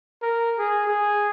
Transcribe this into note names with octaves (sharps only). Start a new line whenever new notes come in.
A#4
G#4
G#4